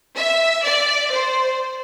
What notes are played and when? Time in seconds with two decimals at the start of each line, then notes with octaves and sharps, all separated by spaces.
0.17 E5
0.64 D5
1.11 C5